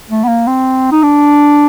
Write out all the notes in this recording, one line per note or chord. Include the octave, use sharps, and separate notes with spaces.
A3
B3
A#3
C4
D#4
D4